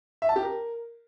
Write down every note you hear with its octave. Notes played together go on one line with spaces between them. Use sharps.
E5
A5
G4
A#4